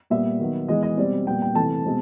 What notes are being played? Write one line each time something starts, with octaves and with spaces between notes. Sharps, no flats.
A#2 G3 B3 E5
D#3 F#3 B3
E3 G#3 B3 D#5
D#5
B2 G3 C4 D5
A#2 G3 B3 G5
G5
C3 E3 A3 A5
B2 G#3 C4